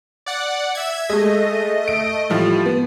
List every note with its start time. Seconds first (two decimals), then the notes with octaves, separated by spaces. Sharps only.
0.26 D5 F#5
0.75 E5 G#6
1.09 G#3 A3 D#5
1.88 D7
2.30 A2 F3 G3
2.66 B3